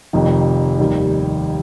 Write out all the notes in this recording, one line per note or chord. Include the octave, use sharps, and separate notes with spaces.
F1 F2 D#3
F1 D#2 D#3 G3